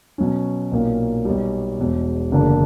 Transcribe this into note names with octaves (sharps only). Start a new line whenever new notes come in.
B2 F#3 C#4
B1 A#2 A#3
B1 B2 G3
E1 E2 B2
F#1 E2 D3 A#3 D4